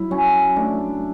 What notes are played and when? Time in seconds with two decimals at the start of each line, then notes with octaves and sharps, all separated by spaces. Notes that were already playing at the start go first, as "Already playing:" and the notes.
Already playing: F#3 E4
0.11 F#3 C#4
0.56 A3 D4